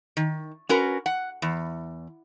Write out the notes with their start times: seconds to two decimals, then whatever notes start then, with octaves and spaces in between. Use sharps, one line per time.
0.17 D#3
0.69 C#4 F#4 A#4 B4
1.06 F#5
1.42 E2